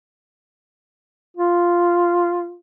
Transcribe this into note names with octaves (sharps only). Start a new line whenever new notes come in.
F4